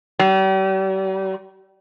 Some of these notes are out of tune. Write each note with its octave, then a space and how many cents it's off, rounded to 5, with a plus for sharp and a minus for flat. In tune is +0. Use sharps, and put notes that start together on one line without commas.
G3 -40